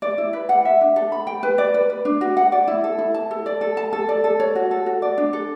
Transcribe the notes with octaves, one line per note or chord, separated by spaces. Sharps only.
D5
E4
B4
F#5
E5
D4
A4
B5
G5
B4
D5
B4
B4
D4
F#4
F#5
D5
E4
A4
E4
A5
A4
D5
A4
A5
A4
D5
A4
C#5
F#4
A4
F#4
D5
D4
A4